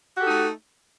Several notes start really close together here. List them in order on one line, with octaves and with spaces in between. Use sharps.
F#4 G4 A4 D#4 A3